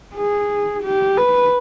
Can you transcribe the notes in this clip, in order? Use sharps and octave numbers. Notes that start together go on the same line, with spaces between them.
G#4
G4
B4